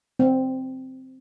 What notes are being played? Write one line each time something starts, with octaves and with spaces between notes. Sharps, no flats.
C4